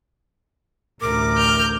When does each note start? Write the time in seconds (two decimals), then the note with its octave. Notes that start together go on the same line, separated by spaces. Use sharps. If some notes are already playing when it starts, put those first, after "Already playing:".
1.01 A1 D2 A#4 D6
1.37 F6 G6